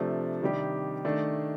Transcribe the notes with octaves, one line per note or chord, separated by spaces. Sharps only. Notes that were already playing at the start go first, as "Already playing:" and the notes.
Already playing: C3 F3 A3 D4
C3 D#3 G3 D4 G4
D#3 A3 D4